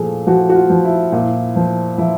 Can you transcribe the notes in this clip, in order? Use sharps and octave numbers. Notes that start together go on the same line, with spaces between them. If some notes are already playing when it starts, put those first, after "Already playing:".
Already playing: A#2 F3 G#4 A4
F3 F#4
F#4
F4
F3
E4
A#2
F3
F3 E4